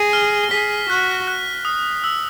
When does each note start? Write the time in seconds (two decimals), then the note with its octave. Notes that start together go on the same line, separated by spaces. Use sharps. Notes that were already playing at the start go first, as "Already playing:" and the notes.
Already playing: G#4 A#6
0.13 F6
0.51 G#4 B6
0.89 F#4 F#6
1.27 F#6
1.65 D#6
2.04 E6